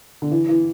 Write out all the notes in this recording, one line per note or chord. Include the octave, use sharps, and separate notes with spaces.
D3
E3
E3